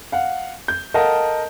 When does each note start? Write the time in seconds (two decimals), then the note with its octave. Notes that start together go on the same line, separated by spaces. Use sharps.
0.12 F5 F#5
0.68 G6
0.94 A4 A#4 D#5 F5 F#5 A5